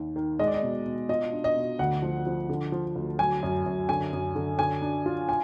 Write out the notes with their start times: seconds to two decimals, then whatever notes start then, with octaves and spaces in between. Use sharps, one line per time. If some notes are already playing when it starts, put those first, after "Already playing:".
Already playing: D#2 D#3
0.16 D#3
0.39 G#3 D#5
0.47 D5
0.54 D#5
0.62 B2
0.86 B2
1.09 F4 D#5
1.33 D4
1.44 D#5
1.56 B2
1.79 D2 F#5
2.02 F3
2.26 F3
2.49 D3
2.72 F3
2.96 D2
3.19 F#3 G#5
3.43 F#2
3.66 F#2
3.89 D3 G#5
4.13 F#2
4.35 D3
4.59 D3 G#5
4.82 D4
5.06 F4
5.29 G#5